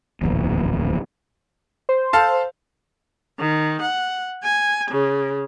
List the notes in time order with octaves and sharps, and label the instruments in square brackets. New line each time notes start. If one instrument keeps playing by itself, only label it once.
[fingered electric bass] D1 A#1 E2
[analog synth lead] C5
[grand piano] A4 F5 A5
[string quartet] D#3
F#5
G#5
C#3